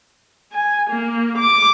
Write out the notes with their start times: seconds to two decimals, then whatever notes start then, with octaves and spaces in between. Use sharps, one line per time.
0.52 G#5
0.90 A#3
1.38 D6